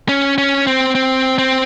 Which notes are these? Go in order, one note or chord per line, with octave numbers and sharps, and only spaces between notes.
C#4
C#4
C4
C4
C4